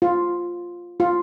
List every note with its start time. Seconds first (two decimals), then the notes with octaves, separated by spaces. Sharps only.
0.02 F4
1.00 F4